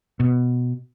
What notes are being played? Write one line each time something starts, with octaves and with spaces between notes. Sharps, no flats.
B2